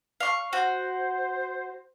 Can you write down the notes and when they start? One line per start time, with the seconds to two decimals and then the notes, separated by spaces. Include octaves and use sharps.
0.20 F5 C#6
0.53 F#4 C5